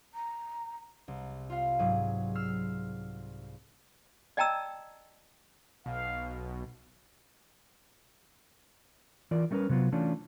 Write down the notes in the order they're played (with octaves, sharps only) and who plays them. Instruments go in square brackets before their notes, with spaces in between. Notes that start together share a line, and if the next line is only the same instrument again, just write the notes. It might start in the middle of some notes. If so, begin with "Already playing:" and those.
[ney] A#5
[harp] C2
F4 F5
G#2 F#3 G#4
E6 F6 C7
[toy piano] D5 D#5 G5 A5 A#5 E6
[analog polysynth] B1 B2 [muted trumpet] F5
[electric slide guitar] E3 F4 A#4 D5
G3 A3 C#4 D#4 A#4 B4
C3 F#3 B3 F4
E3 A3 C#4 D4 F4